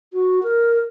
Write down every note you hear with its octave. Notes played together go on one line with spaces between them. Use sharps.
F#4
A#4